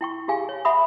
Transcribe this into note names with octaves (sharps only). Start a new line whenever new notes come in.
E4 G5 C#6
G4 G#4 F5 G#5
C#5
E5 F#5 B5 D#6